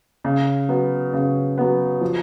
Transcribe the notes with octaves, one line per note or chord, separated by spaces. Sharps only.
C#3
F#3 B3
C#3
F#3 B3
F3